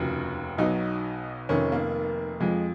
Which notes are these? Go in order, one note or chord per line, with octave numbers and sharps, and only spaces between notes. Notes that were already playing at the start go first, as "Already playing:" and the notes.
Already playing: F1 D#2 C#3 F3 F#4
B1 B2 F#3 D#4
F1 F2 D#3 C#4
A#3
F2 F3 G#3